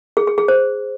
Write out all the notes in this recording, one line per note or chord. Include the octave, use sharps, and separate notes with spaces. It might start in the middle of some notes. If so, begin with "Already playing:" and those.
G#4
G#4
G#4
C5